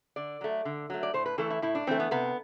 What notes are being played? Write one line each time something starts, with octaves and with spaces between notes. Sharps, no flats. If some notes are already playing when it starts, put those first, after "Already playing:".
D3 D5
F#3 A3
D3
F#3 A3
D5
A2 C5
B4
E3 A3 A4
E4
A2 E4
D4
E3 A3 C4
B3
C3 B3